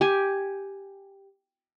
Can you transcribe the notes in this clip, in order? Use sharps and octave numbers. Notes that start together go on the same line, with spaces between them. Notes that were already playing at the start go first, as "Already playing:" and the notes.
G4 G#5